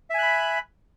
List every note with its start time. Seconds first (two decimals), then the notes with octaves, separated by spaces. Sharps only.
0.10 E5
0.14 G#5
0.18 F#6
0.23 B5